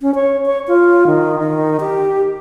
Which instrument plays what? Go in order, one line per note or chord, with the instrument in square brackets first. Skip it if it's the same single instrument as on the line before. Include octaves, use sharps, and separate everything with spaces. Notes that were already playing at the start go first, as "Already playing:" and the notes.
[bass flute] C#4
C#5
C#5
F4
D#3
D#3
G4